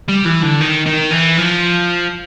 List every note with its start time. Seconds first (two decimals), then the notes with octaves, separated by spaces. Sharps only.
0.09 G3
0.26 E3
0.42 D3
0.61 D#3
0.86 D#3
1.11 E3
1.38 F3